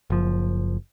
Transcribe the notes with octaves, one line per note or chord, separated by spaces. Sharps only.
F#1 F3